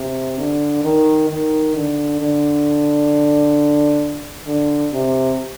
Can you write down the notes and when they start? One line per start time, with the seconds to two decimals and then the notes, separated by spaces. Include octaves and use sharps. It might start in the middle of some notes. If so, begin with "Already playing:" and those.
Already playing: C3
0.39 D3
0.84 D#3
1.30 D#3
1.75 D3
2.21 D3
4.47 D3
4.93 C3